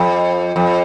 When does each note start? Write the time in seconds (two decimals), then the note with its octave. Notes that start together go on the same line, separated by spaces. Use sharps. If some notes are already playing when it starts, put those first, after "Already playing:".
Already playing: F2
0.56 F2